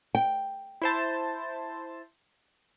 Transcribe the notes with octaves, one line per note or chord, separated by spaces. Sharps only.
G5
E4 C5 A5